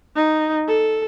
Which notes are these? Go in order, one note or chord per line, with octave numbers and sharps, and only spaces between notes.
D#4
A4